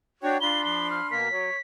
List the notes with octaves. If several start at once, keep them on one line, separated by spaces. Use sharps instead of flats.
D4 F#4 C#5 G5
D4 F4 B5 C6 G7
F3 G7
F6
B2 A#3 A#4 B6
F#3 C#5